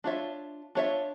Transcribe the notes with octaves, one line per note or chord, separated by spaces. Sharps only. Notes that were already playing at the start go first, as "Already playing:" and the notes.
D4 F4 C#5 E5
D4 F4 C#5 E5